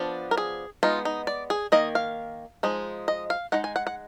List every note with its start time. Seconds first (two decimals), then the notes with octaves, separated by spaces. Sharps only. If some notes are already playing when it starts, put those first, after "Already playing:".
Already playing: F3 B3 D4
0.31 A#4
0.37 G#4
0.83 G#3 B3 D#4 F4
1.05 D#4
1.27 D5
1.50 G#4
1.72 D#3 A#3 D#5
1.95 F5
2.63 F3 G#3 D#4
3.08 D#5
3.30 F5
3.52 G#3 D#4 F#5
3.64 G#5
3.76 F#5
3.87 F#5